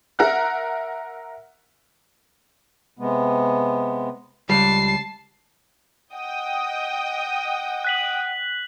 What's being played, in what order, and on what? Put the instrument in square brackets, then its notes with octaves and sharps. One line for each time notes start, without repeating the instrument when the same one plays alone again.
[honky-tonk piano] A#4 E5 F#5 F#6
[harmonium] C3 G#3 B3
[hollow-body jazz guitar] C#2 G3 [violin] A5 C7
[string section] D#5 G5 D#6 [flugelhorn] F#5
[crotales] F#6 B6 F#7